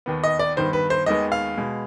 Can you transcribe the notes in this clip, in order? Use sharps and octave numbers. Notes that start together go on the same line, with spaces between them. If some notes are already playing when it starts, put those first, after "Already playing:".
D#2 D#3 B3
D#5
D5
G2 D#3 B3 C5
B4
C5
D#2 D#3 G#3 B3 D#5
F5
B2 G#3 B3